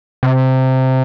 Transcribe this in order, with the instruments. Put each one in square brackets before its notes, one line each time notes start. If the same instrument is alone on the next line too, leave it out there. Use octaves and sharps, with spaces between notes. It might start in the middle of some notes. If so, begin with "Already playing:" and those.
[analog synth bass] C3